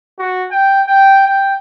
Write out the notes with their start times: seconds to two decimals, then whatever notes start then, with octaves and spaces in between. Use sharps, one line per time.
0.19 F#4
0.51 G5
0.87 G5
1.26 G5